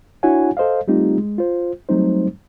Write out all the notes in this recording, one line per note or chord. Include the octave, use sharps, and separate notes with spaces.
D4 E4 F#4 C#5 F#5 G#5
A4 C5 D#5 F5
G3 A3 C4 D#4 F4 G4
G#3
F4 C5
F#3 G3 A3 C4 D#4 C5